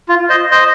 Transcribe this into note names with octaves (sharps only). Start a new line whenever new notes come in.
F4
C5 D#5
C5 D#5